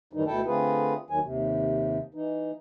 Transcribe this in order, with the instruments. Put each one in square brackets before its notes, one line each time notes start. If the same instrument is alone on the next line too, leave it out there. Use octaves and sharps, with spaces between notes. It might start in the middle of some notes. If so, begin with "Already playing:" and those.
[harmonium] F#2 A2 D#3 E3 G3 D#4
D2 B2 E4 A4 G5 A5
D3 A3 C4 F4 G#4 B4
D#2 D#3 F#3 G#5
D#2 C3
E3 D#4